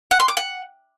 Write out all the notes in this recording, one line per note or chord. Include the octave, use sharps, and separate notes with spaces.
F#5
C6
D6
F#5